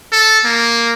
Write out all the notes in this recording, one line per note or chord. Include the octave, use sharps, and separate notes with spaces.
A4
A#3